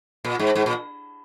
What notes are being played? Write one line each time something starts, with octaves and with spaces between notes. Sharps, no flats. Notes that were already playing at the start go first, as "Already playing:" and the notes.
A#2
G#2
G#2
A#2